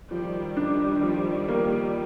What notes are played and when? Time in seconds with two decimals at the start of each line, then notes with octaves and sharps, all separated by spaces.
0.10 D#3 F3 G3
0.57 D4
1.03 F3
1.49 A#3